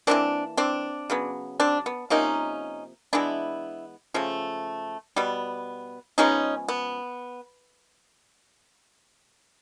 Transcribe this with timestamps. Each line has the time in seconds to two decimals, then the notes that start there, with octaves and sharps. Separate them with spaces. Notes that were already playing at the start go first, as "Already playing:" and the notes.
0.07 E3 G3 A#3 C4 D4
0.57 C4 D4
1.10 C#3 F#3 B3
1.60 C4 D4
1.86 B3
2.10 C3 F3 A#3 C#4 D#4
3.13 E3 G#3 B3 D4 E4
4.14 C#3 F3 A3
5.16 B2 G3 B3
6.18 C#3 F3 G#3 B3 C#4 D#4
6.68 B3